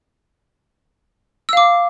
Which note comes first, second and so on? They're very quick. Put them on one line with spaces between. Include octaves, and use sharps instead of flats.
E6 F5 D6